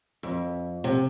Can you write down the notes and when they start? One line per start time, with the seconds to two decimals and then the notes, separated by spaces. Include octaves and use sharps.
0.23 F2
0.84 C3